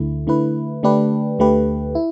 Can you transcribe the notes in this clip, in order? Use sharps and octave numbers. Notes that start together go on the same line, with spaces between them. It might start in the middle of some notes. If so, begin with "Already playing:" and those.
Already playing: D2 D3 A3 E4
D3 A3 E4 B4
D3 A3 D4 G4 B4
D2 D3 A3 G4 B4
E4